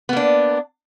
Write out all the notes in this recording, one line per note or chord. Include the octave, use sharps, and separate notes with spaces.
A#3 B3 D4